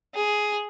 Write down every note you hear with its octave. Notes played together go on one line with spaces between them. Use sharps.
G#4